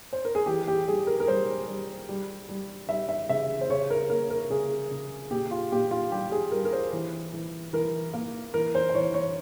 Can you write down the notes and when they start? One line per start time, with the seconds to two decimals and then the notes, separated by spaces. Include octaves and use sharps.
0.13 C5
0.25 A#4
0.35 G#4
0.46 E3 G4
0.67 G4
0.87 G3 G#4
1.07 A#4
1.20 A#4
1.28 G3 C5
1.68 G3
2.09 G3
2.49 G3
2.89 G3 E5
3.09 E5
3.29 C#3 E5
3.61 C5
3.69 C#3 C#5
3.90 A#4
4.10 A#3 A#4
4.30 A#4
4.50 C#3 G#4
4.91 C#3
5.31 A#2 G4
5.51 F4
5.72 A#2 G4
5.91 F4
6.12 G3 G4
6.31 G#4
6.52 G3 A#4
6.65 A#4
6.73 C5
6.93 E3
7.33 E3
7.73 E3 A#4
8.14 A#3
8.54 E3 A#4
8.75 C5
8.89 C5
8.94 E3 C#5
9.14 C#5